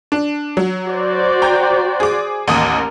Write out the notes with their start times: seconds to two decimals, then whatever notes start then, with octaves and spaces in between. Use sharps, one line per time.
0.12 D4
0.57 F#3
0.87 F#4 C5 D5
1.42 G5 A#5 G6
2.00 G#4 D6
2.48 A1 D#2 A#4 D#6